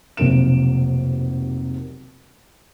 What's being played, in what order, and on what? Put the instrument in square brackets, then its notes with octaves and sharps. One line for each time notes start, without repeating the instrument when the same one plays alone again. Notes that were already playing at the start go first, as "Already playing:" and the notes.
[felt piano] F1 B1 C3 A#3 D7 E7